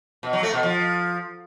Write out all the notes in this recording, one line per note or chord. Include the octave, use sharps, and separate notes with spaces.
B2
F#3
A3
B2
F3